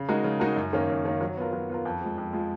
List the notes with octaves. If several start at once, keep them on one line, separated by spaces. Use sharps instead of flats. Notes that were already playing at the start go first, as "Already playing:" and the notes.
Already playing: C#3
G#3 D#4 F#4 A#4
C#3
G#3 D#4 F#4 A#4
F#2
D#3 A#3 C#4
F#2
D#3 A#3 C#4
F#3
B3 F4 A#4
F#3
B3 F4 A#4
F2
F3 G#3
F2
F3 G#3